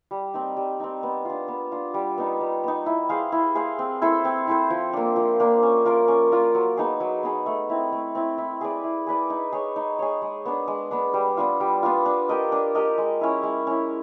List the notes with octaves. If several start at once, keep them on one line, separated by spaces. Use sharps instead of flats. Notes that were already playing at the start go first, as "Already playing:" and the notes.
G3
C4 D#4
G3
C4 D#4
B3
D4 F4
B3
D4 F4
G3
B3 D#4
G3
B3 D#4
E4
G#4 C5 F5
E4
G#4 C5 F5
C4
E4 A4 C5
C4
E4 A4 C5
F3
A#3 D4
F3
A#3 D4
C#4
F4 A#4 D5
C#4
F4 A#4 D5
F#3
B3 D#4 G#4
F#3
B3 D#4 G#4
A3
C4 E4
A3
C4 E4
E4
G#4 B4 D5
E4
G#4 B4 D5
D#4
G#4 C#5
D#4
G#4 C#5
G#3
B3 D4
G#3
B3 D4
G3
B3 D4 F4
G3
B3 D4 F4
D4
G4 A#4 D#5
D4
G4 A#4 D#5
G#3
C#4 E4
G#3
C#4 E4